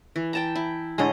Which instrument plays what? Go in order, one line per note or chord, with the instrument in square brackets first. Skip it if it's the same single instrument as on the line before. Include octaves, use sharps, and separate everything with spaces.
[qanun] E3
G5 A5 A#5
E4
[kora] A2 D3 G#3 [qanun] C#5 D#5 A#5